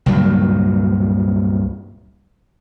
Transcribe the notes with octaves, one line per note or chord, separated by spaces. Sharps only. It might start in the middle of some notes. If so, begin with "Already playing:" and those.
C#2 G2 A#2 F#3